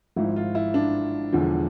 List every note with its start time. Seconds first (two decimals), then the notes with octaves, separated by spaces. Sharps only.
0.16 G#1 G#2 F3 E4
0.36 F4
0.55 E4
0.74 D4
1.32 E1 E2 D3 F3